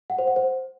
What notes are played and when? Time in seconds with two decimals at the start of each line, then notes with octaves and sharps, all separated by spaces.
0.10 F#5
0.19 C5
0.27 F#5
0.36 C5